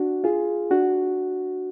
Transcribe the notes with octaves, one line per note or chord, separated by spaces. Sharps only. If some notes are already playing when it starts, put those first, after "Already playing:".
Already playing: D4 F#4
F4 G#4
D4 F#4